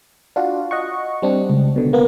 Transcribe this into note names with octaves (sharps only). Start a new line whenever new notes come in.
D4 F4 F#4
D#5 F#5 C#6
G3 C4 D4
C#2
B2 D3
A#3 B3 A#4